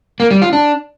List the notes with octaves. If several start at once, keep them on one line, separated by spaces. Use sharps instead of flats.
A#3
G3
F4
D4